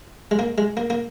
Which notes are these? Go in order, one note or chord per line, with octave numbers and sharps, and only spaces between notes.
G#3
A#3
G#3
A#3
A#3